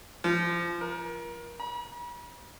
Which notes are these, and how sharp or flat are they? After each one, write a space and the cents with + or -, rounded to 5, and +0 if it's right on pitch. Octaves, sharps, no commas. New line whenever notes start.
F3 -25
A#4 +30
B5 -45